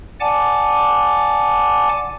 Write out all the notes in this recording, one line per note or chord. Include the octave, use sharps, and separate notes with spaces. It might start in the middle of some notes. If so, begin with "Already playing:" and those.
D5 F#5 G#5 A5 D6